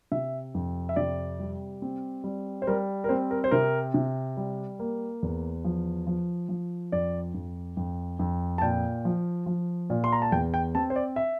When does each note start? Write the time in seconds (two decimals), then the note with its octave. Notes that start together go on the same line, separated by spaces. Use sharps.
0.12 C3 E5
0.55 F2
0.89 E5
0.96 C3 D5
1.40 G3
1.82 C4
2.24 G3
2.62 C5
2.67 G3 A#4
3.04 A#4
3.09 C4 C5
3.31 A#4
3.44 C5
3.51 C3 A#4
3.94 C3
4.37 G3
4.79 A#3
5.23 E2
5.64 F3
6.07 F3
6.49 F3
6.92 F2 D5
7.34 F2
7.77 F2
8.19 F2
8.58 A5
8.62 A#2 G5
9.05 F3
9.46 F3
9.90 A#2
10.04 C6
10.12 A#5
10.22 A5
10.32 E2 G5
10.54 G5
10.75 C4 A5
10.90 C5
10.96 D5
11.16 E5